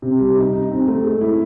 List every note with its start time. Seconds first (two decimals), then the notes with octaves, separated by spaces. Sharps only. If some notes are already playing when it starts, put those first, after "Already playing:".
0.02 C3
0.20 G3
0.37 D#4
0.53 D#4
0.71 C4
0.88 A3
1.04 G#3
1.21 E4